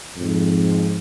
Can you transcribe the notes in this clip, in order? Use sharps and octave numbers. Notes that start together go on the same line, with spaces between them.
F2 G#2